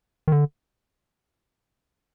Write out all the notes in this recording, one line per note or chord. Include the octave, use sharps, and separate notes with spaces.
D#3
D3